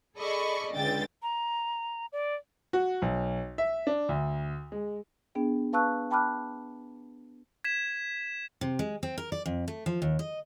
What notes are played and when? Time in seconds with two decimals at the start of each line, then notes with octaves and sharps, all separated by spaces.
0.18 G#4 A4 D5 D#5 B5 C#6
0.74 C#2 D3 G5 A6
1.23 A#5
2.12 D5
2.73 F#4
3.02 B1
3.58 E5
3.87 D4
4.09 D2
4.72 G#3
5.35 B3 D4 G#4 G5
5.73 B4 F5 A5 C#6 E6 F#6
6.11 G5 A5 B5 D6 F6 F#6
7.64 G#6 B6 E7
8.61 C3
8.79 G#3
9.03 C4
9.18 A#4
9.32 D5
9.46 F2
9.68 A3
9.86 F3
10.02 D#2
10.19 D#5